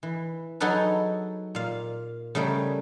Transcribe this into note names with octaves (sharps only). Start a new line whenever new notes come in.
E3
F#3 D#4 F#4 G#4 A4 B4
A#2 F5
C#3 G3 A3 G#4 A#4 G5